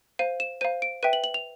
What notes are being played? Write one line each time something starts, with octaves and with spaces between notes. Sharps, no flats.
C5 F5 D#7
E7
C5 F5 D#7
D7
B4 E5 G5 D#7
F#7
F#7
F7